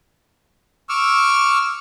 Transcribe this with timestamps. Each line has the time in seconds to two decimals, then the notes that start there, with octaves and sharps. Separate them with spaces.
0.89 C#6 D6 E6 F6